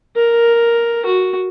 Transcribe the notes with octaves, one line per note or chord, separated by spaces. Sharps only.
A#4
F#4